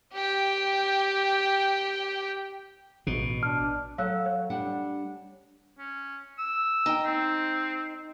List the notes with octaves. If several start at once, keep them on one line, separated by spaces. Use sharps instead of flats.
G4 G5
A1 B2
D4 F6
F#3 A4 F5 E6 F#6
C#5
G3 D4 F#5
C#4
E6
D#4 G5
C4